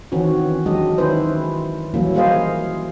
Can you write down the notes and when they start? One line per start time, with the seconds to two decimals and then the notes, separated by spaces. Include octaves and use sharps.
0.12 D#3 E3 C4 C#4 F#4
0.66 F#3 G#3 D4 G4 D#5
0.98 D#3 C#4 E4 B4 C5
1.94 E3 F#3 G3 A#3 C#4 E4
2.15 G3 A#3 G#4 C5 D#5 F5